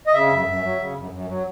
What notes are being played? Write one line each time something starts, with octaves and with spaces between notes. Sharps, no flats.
D#5
C#3 E5
F#2
F#2
F#3
C#3
F#2
F#2
F#3